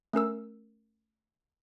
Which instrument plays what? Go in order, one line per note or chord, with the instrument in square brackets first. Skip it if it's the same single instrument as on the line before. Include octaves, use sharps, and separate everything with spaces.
[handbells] A3 C#4 A#4 E6